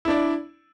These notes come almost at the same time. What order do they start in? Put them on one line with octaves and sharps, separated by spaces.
E4 D4 D5